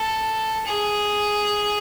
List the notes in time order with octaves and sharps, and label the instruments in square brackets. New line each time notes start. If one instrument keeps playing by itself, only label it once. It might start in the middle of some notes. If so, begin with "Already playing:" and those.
Already playing: [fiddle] A4
G#4